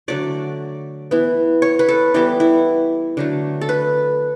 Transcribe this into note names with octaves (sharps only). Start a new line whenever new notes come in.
D3 F#3 A3 D5
E3 B3
C#5
B4
A4
E3 G3 B3 G4
E4
D3 F#3 A3
A4
B4